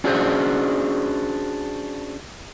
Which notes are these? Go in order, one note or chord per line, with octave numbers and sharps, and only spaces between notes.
C#4 D4 F#4 G#4 B4 C5